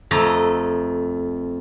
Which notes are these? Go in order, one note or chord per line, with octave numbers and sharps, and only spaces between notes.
F2 A3 D#5 A#5